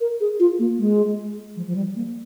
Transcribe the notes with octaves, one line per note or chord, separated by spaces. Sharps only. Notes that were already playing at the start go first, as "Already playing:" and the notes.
A#4
G#4
F4
A#3
G#3
F3
F3
G3
A#3